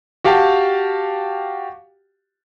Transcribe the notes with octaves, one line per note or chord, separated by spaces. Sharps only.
F#4 G4 F5 G5 A5